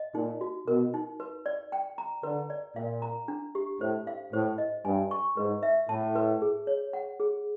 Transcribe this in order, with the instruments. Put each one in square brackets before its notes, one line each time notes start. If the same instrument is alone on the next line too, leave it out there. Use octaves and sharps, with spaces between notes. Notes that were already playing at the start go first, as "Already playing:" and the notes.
Already playing: [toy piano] D#5
[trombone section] A#2 [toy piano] D#4
[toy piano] F#4
[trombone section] B2 [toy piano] A#4
[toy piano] D#4
B4
D5
G5
A#5
[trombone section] D3 [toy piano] B4
[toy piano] D5
[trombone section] A#2 [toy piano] F5
[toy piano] A#5
D4
G4
[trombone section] A2 [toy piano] C5
[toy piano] F5
[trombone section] A2 [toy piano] C5
[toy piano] D#5
[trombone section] G2 [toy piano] G#5
[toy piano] C#6
[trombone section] G#2 [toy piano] B4
[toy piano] E5
[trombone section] A2 [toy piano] A5
[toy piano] B4
G#4
C#5
F#5
G#4